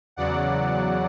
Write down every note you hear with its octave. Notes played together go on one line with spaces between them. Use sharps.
E2 C#3 F#3 D5 F#5